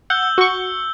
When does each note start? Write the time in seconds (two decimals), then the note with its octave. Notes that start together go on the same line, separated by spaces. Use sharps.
0.10 F#5 E6 G6 G7
0.23 E6
0.38 F#4 C#6